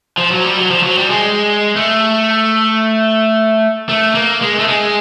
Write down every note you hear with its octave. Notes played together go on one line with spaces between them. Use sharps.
F3
F#3
G3
F#3
F3
F#3
G3
G#3
A3
A3
A#3
G#3
A3
G#3